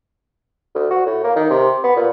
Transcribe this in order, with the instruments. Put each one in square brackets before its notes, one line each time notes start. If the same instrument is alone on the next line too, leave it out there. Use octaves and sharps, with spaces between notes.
[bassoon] D2
F#4
A2
A#3
D#3
C3
B3
A#2